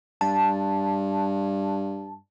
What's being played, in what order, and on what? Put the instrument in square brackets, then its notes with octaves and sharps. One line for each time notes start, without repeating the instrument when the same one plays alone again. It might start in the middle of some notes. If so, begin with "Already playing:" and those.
[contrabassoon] G2 [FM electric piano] A5